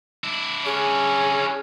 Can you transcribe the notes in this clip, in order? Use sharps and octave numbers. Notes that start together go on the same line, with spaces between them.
D4 E4
C#4 G#4